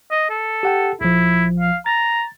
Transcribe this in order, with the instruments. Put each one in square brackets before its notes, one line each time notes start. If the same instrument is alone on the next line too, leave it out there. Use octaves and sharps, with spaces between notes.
[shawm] D#5
A4
[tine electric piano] G4 F#5 G5
[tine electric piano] A#1 F3 [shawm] E4
[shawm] F5
[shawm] A#5 [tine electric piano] A6